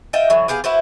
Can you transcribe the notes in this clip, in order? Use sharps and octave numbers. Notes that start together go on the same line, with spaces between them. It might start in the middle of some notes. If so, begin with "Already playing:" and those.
F4 D#5 E5 G5
D3 E3 F#3
B3 G4 G#4 F5
E4 F#4 B4 C5